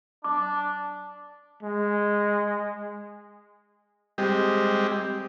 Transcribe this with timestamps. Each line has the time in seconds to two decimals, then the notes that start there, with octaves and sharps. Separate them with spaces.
0.24 D4 D6
1.63 G#3
4.18 G3 G#3 C4 G4 D#5